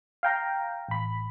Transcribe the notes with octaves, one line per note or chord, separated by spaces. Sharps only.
F5 G5 A#5
A1 B5